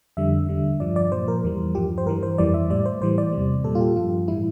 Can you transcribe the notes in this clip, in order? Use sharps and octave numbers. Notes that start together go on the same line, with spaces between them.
F2 D3 G3 E5
E2 D3 G3
G2 F3 D5
D5
A#2 F3 C5
A#4
E2 E3 G3
G2 F3 G4
C5
G2 E3 G3 A#4
C5
F2 E3 G3 D5
E5
A2 G3 D5
C5
A2 E3 G3 C5
D5
E2 C3 G3
A#2 G3 A4
F4
G4
G2 F3 F4
A2 E3 G3 E4